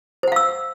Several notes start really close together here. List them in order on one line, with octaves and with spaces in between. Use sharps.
C5 F#5 F5 E6